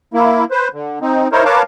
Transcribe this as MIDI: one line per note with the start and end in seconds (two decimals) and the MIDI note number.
0.14 0.45 58
0.14 0.45 64
0.51 0.68 71
0.51 0.68 72
0.74 0.99 50
1.02 1.28 60
1.02 1.28 63
1.32 1.44 63
1.32 1.44 64
1.32 1.44 70
1.32 1.44 72
1.32 1.44 73
1.45 1.62 70
1.45 1.62 71
1.45 1.62 73
1.45 1.62 77
1.45 1.62 81
1.45 1.62 86